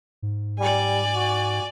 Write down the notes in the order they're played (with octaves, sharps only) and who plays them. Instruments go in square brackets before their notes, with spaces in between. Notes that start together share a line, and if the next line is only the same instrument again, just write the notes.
[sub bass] G#2
[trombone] G3 [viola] D5 G#5
[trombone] F#4